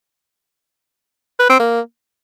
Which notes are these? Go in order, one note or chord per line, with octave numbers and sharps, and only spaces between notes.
B4
C4
A#3